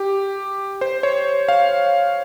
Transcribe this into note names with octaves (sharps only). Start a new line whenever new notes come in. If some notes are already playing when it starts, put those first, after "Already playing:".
Already playing: G4
C5
C#5
F5